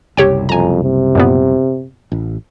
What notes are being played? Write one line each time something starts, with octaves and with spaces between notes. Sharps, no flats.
F#1 C2 G4 C#5 G5
F2 G#5 A#5
C3
F#2 A#2 B3
A1